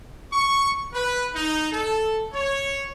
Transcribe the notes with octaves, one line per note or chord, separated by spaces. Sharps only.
C#6
B4
D#4
A4
C#5